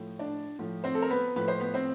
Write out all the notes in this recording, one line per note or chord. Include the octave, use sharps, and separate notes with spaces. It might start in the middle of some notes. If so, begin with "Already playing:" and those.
Already playing: A2 F3
D4 D5
A2 F3
C4 C5
A4
A#4
B3 B4
A2 F3 B4
C5
B3 B4
C4 C5